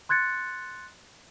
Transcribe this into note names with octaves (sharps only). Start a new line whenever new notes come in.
C6 F#6 G#6 A6 C#7